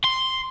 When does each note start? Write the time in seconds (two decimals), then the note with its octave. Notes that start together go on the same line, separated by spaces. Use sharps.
0.04 C6